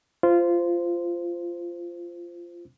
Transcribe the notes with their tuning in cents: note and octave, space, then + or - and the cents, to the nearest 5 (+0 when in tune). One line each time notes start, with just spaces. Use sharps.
F4 -15 C5 -10